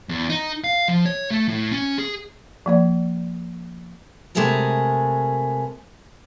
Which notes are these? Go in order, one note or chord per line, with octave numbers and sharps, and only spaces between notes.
E2
D#4
F5
F3
C#5
A3
A2
C#4
G#4
F3 A#3 D5
C3 G#3 A3 G#4 A#4 B4